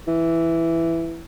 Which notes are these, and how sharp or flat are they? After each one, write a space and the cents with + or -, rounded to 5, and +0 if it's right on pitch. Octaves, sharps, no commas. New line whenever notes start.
E3 +5